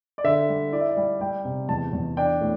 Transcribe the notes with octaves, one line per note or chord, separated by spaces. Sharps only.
D5
D3 E5
G3
E4 D5
E5
D5
G3
G3 G5
C3
E2 A5
E2
D4 G5
A2